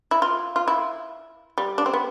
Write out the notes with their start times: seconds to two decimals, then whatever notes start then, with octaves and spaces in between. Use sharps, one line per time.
0.11 E4
0.22 F4
0.56 F4
0.68 E4
1.58 G3
1.78 D4
1.86 C4
1.94 B3